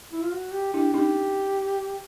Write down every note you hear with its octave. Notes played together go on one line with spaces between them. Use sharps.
E4
F4
F#4
G4
D4 E4 G4
C#4 D#4 G4